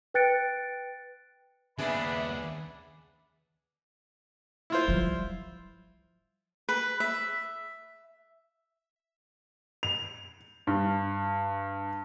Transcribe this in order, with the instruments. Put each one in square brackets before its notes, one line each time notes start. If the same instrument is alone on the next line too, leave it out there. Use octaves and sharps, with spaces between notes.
[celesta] B4 G5 F#6 A6 C#7 D7
[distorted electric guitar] D#2 C#3 [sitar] B3 D4 G#4 [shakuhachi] E5 [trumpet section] B5
[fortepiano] E4 F4 C5
[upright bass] F3 G3
[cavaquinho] B4
E5
[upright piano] F7
G2